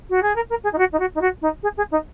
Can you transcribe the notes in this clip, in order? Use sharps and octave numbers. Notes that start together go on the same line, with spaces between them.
F#4
G#4
A#4
A#4
G#4
D#4
F#4
D#4
F#4
D#4
F#4
D#4
G#4
G#4
D#4